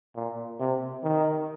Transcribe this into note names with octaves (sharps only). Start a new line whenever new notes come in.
A#2
C3
D#3